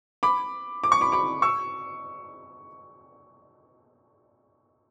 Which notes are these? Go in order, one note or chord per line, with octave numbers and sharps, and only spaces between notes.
B5 D6
D6
C#6
B5 D6
B5 D6
C#6 E6